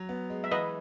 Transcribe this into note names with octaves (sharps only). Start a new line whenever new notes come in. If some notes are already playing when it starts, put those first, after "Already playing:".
Already playing: F#3
B3
G#3
E5
E3 B4 D#5